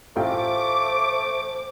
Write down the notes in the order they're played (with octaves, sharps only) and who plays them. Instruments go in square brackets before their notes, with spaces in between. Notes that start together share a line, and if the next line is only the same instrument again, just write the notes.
[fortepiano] A1 F4 G5 [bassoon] A3 [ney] C5 [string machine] D6